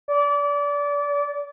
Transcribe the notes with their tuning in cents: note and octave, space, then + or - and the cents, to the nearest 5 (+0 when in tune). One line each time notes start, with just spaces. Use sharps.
D5 -30